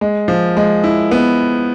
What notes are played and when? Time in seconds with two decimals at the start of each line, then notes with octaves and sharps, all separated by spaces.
0.01 G#3
0.28 F3
0.57 G#3
0.84 E4
1.11 B3